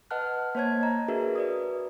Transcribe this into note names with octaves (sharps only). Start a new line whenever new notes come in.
B4 D#5 F#5 A5 F6 F#6
A#3 C5 C#5 A5 G#6
D#5 A#5
D4 F#4 G#4 A#4 B4 E5
B4 D5 D#6